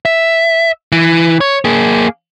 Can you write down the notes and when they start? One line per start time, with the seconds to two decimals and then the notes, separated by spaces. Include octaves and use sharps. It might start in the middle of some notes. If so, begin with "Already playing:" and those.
0.05 E5
0.92 E3
1.41 C#5
1.65 A#3 G#4